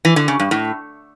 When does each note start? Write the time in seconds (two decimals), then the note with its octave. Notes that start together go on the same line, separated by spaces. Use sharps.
0.05 E3
0.16 D3
0.28 C#3
0.40 G2
0.51 A2